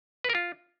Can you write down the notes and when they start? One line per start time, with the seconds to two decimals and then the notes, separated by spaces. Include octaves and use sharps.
0.24 B4
0.30 A#4
0.35 F4